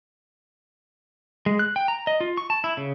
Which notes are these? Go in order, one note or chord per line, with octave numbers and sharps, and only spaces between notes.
G#3
F#6
G5
A#5
D#5
F4
C#6
A5
E4
C#3